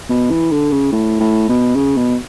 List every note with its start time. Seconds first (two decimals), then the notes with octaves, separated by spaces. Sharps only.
0.09 B2
0.30 E3
0.52 D3
0.71 C#3
0.92 A2
1.20 A2
1.49 B2
1.75 C#3
1.97 B2